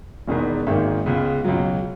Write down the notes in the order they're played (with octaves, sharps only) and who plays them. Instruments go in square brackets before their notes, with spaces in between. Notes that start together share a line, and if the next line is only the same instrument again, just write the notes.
[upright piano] E1 E2 D#3 G#3 B3
G#1 G#2 D#3 A#3 E5
C#2 C#3 G#3 B3
C#2 B2 F#3